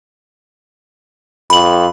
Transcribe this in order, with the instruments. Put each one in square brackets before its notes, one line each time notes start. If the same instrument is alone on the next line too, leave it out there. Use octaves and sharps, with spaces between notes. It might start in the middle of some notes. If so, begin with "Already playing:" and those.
[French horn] F2 [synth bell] B5 F#7